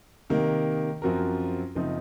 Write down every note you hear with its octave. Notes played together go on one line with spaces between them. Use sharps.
C3 D#3 A#3
F#2 F3 C4 F#4 A#4
F#1 F3 C4 D#4